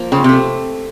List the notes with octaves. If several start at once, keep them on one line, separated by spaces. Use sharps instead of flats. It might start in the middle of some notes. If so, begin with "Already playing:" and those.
Already playing: F3 A#3
C#3 C4
C3 A3